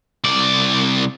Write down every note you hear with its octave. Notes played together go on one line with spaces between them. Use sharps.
C2 D5